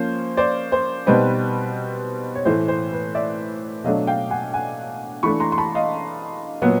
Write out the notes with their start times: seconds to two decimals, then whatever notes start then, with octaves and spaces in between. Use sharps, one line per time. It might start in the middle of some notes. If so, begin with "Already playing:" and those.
Already playing: F3 A#3 C#4 C5
0.37 C5 D5
0.72 C5
1.06 B2 G3 C4 D#4 B4
2.35 C#5
2.45 A2 E3 A3 C5
2.68 C5
2.92 B4
3.15 D5 E5
3.84 B2 F#3 A3 D4 D#5 F5
4.07 F5 G5
4.30 F#5 G#5
4.53 F#5 G#5
5.23 E3 A3 D4 B5 C#6
5.40 A#5 C6
5.52 C6
5.58 A5 B5
5.75 D#5 F5
6.62 A#2 F#3 B3